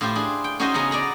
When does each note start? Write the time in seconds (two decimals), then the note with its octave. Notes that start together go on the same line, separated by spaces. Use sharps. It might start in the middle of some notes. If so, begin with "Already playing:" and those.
0.01 A2 E4 F4 G4 C5
0.15 D4 G#4
0.44 G5
0.60 C#4 D#4 F#4 G#4 C5 D#5
0.74 C#3 B3 G#4 A#5
0.91 D5 G#5 A#5 B5